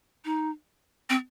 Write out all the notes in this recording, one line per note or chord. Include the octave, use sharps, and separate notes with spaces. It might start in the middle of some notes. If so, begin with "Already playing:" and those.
D#4
C4